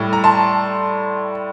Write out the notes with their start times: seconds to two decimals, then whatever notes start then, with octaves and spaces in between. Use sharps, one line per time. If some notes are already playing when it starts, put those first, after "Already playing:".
Already playing: A2 G3
0.13 A#5
0.24 A5 C6